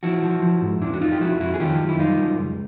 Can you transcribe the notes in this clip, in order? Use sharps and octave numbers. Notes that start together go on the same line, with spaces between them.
F3 E4 F#4
F3
F3
G#2
F2 D4 E4
F#4
F2 D#4 F4
G4
F2 E4 F#4
F2 E4 F#4
G#4
D#3 F4 G4
F#2
E4
G3 D#4 F4
F#2
C#2